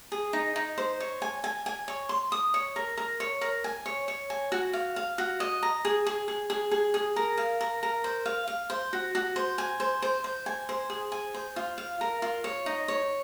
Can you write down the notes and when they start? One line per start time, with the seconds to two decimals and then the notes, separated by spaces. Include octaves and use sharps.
0.12 G#4
0.33 D#4
0.56 D#4
0.78 C5
1.00 C#5
1.22 G#5
1.44 G#5
1.66 G#5
1.88 C#5
2.09 C6
2.32 D#6
2.54 C#5
2.76 A#4
2.97 A#4
3.20 C#5
3.41 A#4
3.64 G#5
3.86 C#5
4.08 C#5
4.30 G#5
4.52 F#4
4.73 F5
4.96 F5
5.18 F#4
5.40 D#5
5.63 A#5
5.85 G#4
6.06 G#4
6.28 G#4
6.50 G#4
6.71 G#4
6.94 G#4
7.16 A#4
7.37 F5
7.61 A#4
7.83 A#4
8.04 C5
8.26 F5
8.48 F5
8.70 C5
8.93 F#4
9.15 F#4
9.36 C5
9.58 G#5
9.80 C5
10.02 C5
10.24 C5
10.46 G#5
10.69 C5
10.90 G#4
11.12 G#5
11.34 C5
11.56 F4
11.78 F5
12.01 A#4
12.22 F4
12.44 C#5
12.66 D#4
12.88 C#5